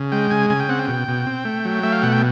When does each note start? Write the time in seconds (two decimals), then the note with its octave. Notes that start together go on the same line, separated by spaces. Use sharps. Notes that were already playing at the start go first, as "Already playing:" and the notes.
Already playing: C#3
0.12 G#3 G5
0.30 C#3 G#5
0.50 C#3 G#5
0.60 G5
0.69 C4 F#5
0.79 G5
0.88 B2
1.08 B2
1.27 C4
1.45 A3
1.65 F#3
1.83 A3 E5
1.92 F5
2.03 B2 F#5
2.12 G5